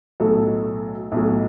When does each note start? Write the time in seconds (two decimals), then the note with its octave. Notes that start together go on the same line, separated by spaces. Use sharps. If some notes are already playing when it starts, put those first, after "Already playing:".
0.20 B1 A2 F#3 A4
1.12 B1 A2 F#3